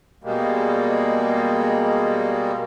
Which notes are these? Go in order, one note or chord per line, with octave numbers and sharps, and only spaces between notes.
B2 G3 G#3 A#3